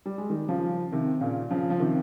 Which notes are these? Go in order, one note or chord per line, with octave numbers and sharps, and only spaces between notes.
G3
G#3
D#3 G3
C#3 F3
C3 D#3
A#2 C#3
C#3 F3
F3
C3 D#3